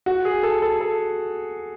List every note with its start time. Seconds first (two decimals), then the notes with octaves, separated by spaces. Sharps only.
0.06 F#4
0.25 G#4
0.43 A4
0.62 A4
0.81 A4